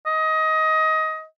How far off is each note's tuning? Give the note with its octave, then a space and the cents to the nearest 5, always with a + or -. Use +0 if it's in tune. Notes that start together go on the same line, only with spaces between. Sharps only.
D#5 +20